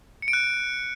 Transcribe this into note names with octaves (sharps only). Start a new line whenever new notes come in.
C#7
D7
F#6